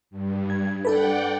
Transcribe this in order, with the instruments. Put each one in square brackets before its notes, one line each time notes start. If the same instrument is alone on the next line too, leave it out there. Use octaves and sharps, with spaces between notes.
[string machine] G2
[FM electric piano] G#6
[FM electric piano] D4 A4 B4 [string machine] D5 F#5 G5